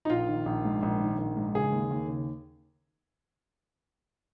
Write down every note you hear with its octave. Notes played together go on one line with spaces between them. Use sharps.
D#4
A#1 F4
D#3
A#1
G#2
A#1
D#3
A#1
G#2
C#3 G#4
D#2
D#2
C#3